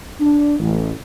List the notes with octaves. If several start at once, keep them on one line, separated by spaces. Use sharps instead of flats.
D4
A1